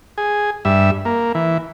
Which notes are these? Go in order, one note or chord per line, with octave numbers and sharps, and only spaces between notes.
G#4
G2 E5
A#3
E3